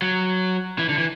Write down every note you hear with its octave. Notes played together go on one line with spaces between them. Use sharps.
F#3
E3
D3
E3